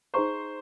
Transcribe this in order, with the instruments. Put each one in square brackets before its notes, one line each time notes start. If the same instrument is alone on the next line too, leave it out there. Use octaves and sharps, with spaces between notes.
[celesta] D#4 G#4 D#5 A#5 C#6 [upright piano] C5